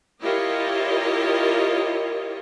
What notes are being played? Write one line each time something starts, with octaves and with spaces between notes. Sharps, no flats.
E4 F4 G4 A#4 C#5 D#5